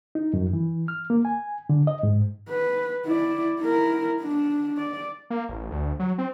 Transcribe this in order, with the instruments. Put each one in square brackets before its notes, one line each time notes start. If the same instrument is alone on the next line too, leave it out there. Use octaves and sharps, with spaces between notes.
[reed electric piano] D#4
F#2
E3
F6
A#3
G#5
D3
D#5
G#2
[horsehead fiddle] B4
E4 D5
E4 A#4
D4
D5
[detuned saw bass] A#3
A1
D2
F#3
C4